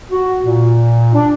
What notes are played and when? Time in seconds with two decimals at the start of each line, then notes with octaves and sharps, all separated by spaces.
0.11 F#4
0.44 A#2
1.14 D4